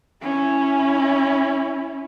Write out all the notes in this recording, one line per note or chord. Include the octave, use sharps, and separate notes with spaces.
C#4 E4